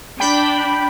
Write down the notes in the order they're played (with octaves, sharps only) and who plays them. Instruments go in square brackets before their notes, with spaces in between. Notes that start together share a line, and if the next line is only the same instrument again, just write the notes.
[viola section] D4 [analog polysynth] G5 B5